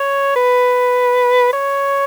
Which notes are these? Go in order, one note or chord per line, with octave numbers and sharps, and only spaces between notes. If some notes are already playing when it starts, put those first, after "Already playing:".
Already playing: C#5
B4
C#5